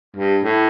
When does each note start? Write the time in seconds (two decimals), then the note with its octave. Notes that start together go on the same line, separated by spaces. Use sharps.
0.16 G2
0.44 A2